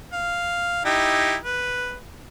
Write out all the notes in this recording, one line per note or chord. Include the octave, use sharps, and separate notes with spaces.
F5
D#4 E4 G4
B4